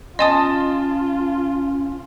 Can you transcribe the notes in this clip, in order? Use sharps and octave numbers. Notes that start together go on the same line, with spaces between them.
C#4 F4 D#5 G#5 A5 C6 D#6